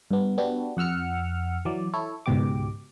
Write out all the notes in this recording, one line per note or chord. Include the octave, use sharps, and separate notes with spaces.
G2 B3
B3 D4 F#4 G4
F2 F#5 E6 F6 C#7
E3 F#3 D5
E4 A4 C#5
C#2 G#2 B2 G4 D6